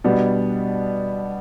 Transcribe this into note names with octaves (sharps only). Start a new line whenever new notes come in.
B2 G3 B3 D4